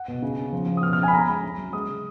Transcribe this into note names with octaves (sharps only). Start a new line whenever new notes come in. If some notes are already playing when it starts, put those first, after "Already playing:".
Already playing: F#5
B2
C#3
C#4
F3
F3
D#6
B2 F6
F6
C#4
G#5
B5
C#4 A#5
G#3 B5
C#4
F#3
G#3 D#6
C#3